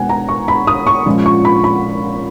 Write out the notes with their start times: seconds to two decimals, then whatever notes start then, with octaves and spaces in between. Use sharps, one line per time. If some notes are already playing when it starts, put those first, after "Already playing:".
Already playing: B2 G#3 B3 F#5 G#5
0.09 A#5
0.29 C#6
0.48 B5
0.67 D#6
0.87 C#6
1.06 A#2 F3 G#3 C#4
1.26 C#6
1.45 B5
1.64 B5